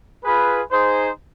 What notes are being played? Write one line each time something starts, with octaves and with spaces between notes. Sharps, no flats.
F4 G#4 B4
D#4 G#4 C5